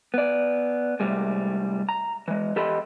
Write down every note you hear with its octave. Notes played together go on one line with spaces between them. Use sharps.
B3 D5
A2 C3 G3 G#3
A#5
E3 G#3
E2 G4 A4 D#5 B5 C6